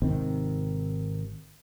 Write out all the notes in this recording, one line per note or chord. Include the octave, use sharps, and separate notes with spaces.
G#1 C3 D#3 C4